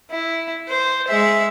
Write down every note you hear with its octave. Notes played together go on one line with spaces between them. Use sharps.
E4
C5
G#3 E5